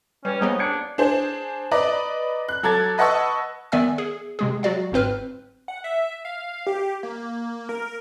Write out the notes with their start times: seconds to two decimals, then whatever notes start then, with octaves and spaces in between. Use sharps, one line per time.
0.25 G3 C#4 B4
0.41 G3 A#3 B3 D#4 G#4 C5 C#5
0.59 D4 G#6 C7 C#7
0.98 D4 G#4 C5
1.71 B4 D5 D#5 A#5 D6
2.49 F#6
2.63 F#3 A4 A#5 D6 G#6 A6
2.98 B4 D#5 F#5 A5 C#6 E6
3.72 D#3 B3 D5 E5 G#5 E6
3.98 G#4
4.39 C3 G#3 G#4
4.63 F#3 F#4 D5 F5
4.92 G1 G#2 C4 B4 F6
5.68 F#5
5.84 E5
6.25 F5
6.67 G4
7.03 A#3
7.69 A#4